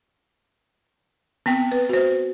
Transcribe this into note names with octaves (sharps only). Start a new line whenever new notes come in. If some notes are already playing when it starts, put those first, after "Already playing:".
B3 C4 G5
B4
F#4 C5